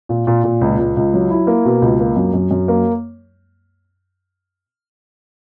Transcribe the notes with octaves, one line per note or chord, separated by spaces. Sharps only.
A#2
A#2
A#2
C#2
C#2
C#2
F#3
E4
A#3
B2
C#2
A#3
F#2
F#2
F#2
A#3